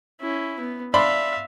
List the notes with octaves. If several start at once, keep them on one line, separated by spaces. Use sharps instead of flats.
C#4 E4
B3
D4 E5 F5 B5 C6